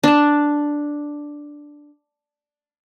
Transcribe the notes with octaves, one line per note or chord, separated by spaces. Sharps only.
D4 A5